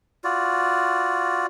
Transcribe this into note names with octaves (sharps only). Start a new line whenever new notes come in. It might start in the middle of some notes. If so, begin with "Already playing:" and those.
F4 F#4 D5